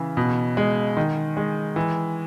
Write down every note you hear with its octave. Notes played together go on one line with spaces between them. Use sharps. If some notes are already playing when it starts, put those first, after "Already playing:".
Already playing: C#3 E3
B2
G#3
D#3
G#3
E3